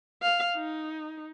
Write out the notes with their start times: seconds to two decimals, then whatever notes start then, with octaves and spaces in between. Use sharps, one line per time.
0.22 F5
0.57 D#4